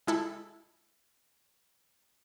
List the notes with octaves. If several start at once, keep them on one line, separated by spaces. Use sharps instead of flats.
G#3 E4 A4